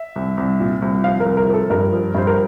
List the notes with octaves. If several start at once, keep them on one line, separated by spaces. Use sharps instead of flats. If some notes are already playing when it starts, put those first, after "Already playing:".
Already playing: E5
C2
C2
A#2
C2
F3 F5
A#4
C2
A#4
F3
A4
G2 A#4
F3
G2 C5
A#4